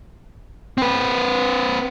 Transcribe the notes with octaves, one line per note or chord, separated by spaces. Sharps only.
C4 B4